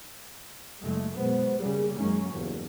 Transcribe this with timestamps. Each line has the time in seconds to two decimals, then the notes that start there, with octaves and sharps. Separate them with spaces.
0.82 F#1 G#3 A3
1.17 F#2 B2 G#3 B3 C5
1.59 C#3 G3 A#3 G#4
1.98 F#2 D#3 G#3 A#3 C#4
2.32 F#1 E2 G2